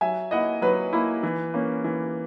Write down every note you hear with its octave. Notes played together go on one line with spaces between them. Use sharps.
F#3 E5 G#5
A#3 E4 D#5 F#5
F#3 B4
A#3 E4
E3
A#3 C#4
E3